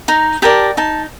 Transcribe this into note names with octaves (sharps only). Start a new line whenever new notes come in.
D#4 A#5
G4 A#4 D5 A5
D#4 A5